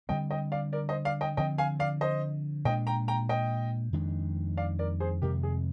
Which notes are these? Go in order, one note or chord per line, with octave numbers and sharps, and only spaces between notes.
D3 G3 C4 D#5 G5
D#5 G5
D5 F5
A#4 D5
C5 D#5
D5 F5
D#5 G5
D3 F3 C4 D#5 G5
F5 G#5
D5 F5
C5 D#5
A#2 G#3 D4 D#5 G5
G5 A#5
G5 A#5
D#5 G5
F2 D#3 G#3 D4
D5 F5
A#4 D5
G#4 C5
F2 C3 D#3 G#3 G4 A#4
G#4